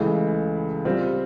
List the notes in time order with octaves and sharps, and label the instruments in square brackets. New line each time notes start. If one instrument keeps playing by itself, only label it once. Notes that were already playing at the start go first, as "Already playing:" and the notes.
Already playing: [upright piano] C#2 C#3 E3 A3
G3 C4 F4